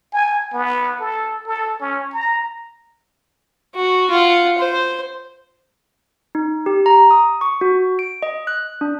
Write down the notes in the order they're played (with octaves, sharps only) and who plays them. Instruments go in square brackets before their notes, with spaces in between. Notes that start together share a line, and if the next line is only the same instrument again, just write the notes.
[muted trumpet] G#5
B3
A4
A4
C#4
A#5
[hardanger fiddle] F#4
F4 F#5
C5
[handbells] D#4
G4
A#5
D#6
C#6
F#4
D7
D#5
F#6
D4